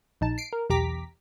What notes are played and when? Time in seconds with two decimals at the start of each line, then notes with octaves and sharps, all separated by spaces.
0.21 A#1 D#4 A5
0.38 C7 D7
0.53 A#4
0.70 B1 E2 G4 A#5 D6 B6